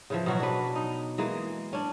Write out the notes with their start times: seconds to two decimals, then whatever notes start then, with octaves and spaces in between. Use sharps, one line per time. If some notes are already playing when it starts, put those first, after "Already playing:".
0.10 C#3 E3 F3
0.26 B2 F#3 F#4
0.40 D4 B4
0.75 D#4
1.18 E3 G#3 A#3
1.73 C#4 D4